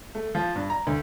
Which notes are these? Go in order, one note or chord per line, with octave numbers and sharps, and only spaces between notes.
A3
F3
G2
A#5
D2